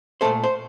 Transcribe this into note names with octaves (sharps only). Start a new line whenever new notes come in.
A#2 A3 A4 C5
C5